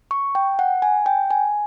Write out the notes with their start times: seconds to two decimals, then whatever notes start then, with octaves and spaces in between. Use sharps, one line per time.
0.11 C#6
0.35 G5
0.59 F#5
0.82 G#5
1.06 G5
1.31 G#5